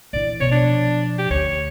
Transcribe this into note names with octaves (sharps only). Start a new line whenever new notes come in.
A#1 E3 D5
B2 F3 C#5
D4
G4
D2 C#5